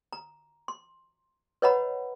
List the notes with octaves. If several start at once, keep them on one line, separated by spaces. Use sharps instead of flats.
A#5
C6
B4 C#5 D#5 F#5 A#5 B5